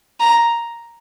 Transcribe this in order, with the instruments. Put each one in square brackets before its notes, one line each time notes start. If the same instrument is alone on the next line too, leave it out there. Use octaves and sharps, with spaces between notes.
[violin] A#5